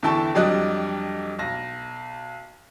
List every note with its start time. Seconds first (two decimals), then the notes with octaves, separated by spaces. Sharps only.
0.03 E2 D3 E4 G5 A5 C#6
0.35 F2 F#3 G3 D4 D#5 F#6
1.39 B1 A#6